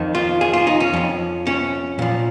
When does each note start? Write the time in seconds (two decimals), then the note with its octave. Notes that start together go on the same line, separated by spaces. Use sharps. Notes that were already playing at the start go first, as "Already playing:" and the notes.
Already playing: F2 D#3
0.15 F4
0.41 G#4
0.53 F4
0.67 D#4
0.80 C#4
0.93 F2 F3
1.47 C#4
1.99 A#2 F3